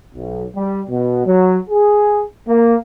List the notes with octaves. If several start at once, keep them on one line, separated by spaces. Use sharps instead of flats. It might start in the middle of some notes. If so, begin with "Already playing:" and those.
B1
G3
B2
F#3
G#4
A#3